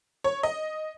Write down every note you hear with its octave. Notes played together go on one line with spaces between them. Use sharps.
C#5
D#5